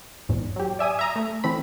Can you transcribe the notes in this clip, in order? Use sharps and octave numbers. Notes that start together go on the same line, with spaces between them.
A#1 E2 G#2
F#3 G4
D5 E5 G#5 D#6
E5 A#5 D#6
A3
E3 A3 C4 B5